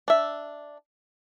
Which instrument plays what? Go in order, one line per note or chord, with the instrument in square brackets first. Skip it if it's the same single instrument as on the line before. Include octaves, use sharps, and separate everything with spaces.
[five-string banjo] D4 E5